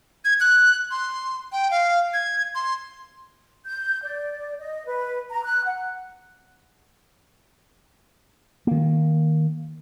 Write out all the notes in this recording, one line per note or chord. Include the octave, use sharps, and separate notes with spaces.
G#6
F#6
C6
G5
F5
G#6
C6
G6
D5
D#5
B4
A#5
F#6
F#5
D#3 A#3